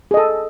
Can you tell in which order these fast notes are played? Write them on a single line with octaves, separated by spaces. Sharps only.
G#4 D#5 A4